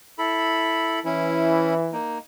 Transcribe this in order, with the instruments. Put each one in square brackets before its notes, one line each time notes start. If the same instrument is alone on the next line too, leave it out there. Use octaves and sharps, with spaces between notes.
[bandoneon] E4 A4 B5
[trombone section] E3 [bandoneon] C#4 E4
[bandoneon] A#3 D#4